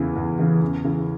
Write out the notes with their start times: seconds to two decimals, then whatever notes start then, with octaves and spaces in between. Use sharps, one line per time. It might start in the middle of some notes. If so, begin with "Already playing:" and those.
Already playing: E2 C#3 E3
0.16 E2
0.39 C#3 E3
0.61 E2
0.84 C#3 E3